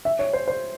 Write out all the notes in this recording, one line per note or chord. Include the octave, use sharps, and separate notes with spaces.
E5
C#5
C5
C5